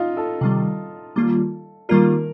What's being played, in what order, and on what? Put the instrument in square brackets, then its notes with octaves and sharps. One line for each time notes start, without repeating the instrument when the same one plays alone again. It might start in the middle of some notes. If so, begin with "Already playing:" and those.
Already playing: [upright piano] D#4 F4
A4
[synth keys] C3 D#3 G3
D#3 G3 A#3 F4
[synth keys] D#3 G3 A#3 F4 [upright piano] A#4